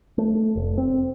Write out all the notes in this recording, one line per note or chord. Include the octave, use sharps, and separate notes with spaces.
A3
F1
C4